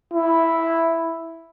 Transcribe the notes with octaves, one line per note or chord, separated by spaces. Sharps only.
E4